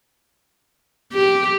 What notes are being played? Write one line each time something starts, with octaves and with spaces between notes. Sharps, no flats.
G4